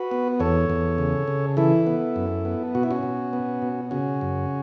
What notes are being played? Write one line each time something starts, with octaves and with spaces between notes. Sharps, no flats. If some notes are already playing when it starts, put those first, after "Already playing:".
Already playing: F#4 B4
B3
E2 A4 C#5
E2
C#3
C#3
E3 E4 A4
B3
F#2
B3
B2 F#4
E4
C#4 F#4
B2
B3
B2
C#3 C#4 F#4
F#2